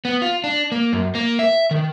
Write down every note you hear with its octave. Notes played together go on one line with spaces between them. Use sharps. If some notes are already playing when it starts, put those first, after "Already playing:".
B3
F4
D4
A#3
F#2
A#3
E5
D#3